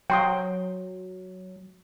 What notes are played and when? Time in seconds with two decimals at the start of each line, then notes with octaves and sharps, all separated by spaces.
0.10 F#3 G5 C6 D#6